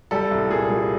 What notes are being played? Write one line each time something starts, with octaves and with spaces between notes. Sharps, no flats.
G3 A4
C2
A#2 G#4
G3